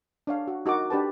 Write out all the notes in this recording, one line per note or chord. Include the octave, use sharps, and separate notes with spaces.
D4 C#5 F5
F#4
D#4 F#4 A#4 D6
D4 G4 B4 A5